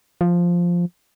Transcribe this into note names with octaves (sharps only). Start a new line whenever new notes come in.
F3